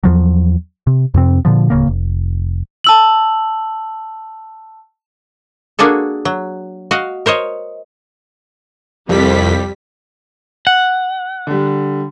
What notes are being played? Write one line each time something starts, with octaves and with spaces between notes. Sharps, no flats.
E2 F3 F#3
C3
F2 C3 C4
A#2 D3 F3
D1 C#3 A#3
F1
A5 E6 F#7
A#3 D4 F#4 G#4 A4
F#3
F#4 D#5 F5
A#4 C5 C#5 D#5
C2 F2 G3 B6
F#5
D3 G3